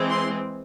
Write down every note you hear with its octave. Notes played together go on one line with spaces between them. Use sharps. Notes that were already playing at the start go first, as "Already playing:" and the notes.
Already playing: E3 G#3 C4
C6